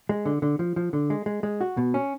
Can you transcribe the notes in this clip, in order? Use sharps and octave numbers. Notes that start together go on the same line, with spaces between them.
G#3
D3
D3
F3
F3
D3
G#3
G#3
G#3
F#4
B2
C#4